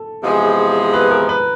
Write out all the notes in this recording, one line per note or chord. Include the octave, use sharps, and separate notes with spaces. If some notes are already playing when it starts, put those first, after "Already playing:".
Already playing: A4
E2 C3 F3 G#3
B4
A#4
B4